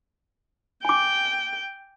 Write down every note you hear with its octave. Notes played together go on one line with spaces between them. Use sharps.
G5 G#5 D6